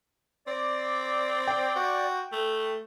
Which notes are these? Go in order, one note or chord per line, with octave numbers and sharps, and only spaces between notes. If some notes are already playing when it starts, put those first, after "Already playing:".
C4 D5
G5
F#4
A3